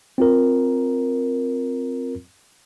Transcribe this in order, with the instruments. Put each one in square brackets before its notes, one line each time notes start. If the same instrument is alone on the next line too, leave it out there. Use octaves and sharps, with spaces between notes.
[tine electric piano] C4 F4 A#4